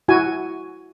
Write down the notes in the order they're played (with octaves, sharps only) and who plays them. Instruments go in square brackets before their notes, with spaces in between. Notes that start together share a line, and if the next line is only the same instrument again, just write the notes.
[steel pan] E4 F#4 G#5